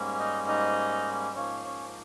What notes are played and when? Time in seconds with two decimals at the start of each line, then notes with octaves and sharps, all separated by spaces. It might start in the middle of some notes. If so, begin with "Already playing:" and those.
Already playing: G#2 G3 A#3 C#4
0.19 D#4 D#5
0.48 D#4 D#5
1.36 G#2 F3 A#3 C#4 C#5
1.65 C#4 C#5